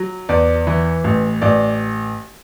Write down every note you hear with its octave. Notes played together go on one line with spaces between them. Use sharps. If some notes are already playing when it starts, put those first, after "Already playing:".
Already playing: F#3
E2 D5
E3
A1
A1 D5